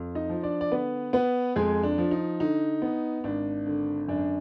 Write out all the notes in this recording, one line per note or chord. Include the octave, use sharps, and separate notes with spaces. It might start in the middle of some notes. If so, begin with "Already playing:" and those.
Already playing: F2
D#4 D#5
F3
D4 D5
D5
D3 B3 B4
B3 B4
F2 G#3 G#4
D4
F3
D#4
D3 D#4
B3
G#1 D4
D3
F#2 D4